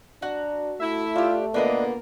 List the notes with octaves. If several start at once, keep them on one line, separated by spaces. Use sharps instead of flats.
D4 F#4 F#5 A#5
A3 E4 E5
D4 F4 G4
A#2 D3 A#3 B3 D4 B4 D#5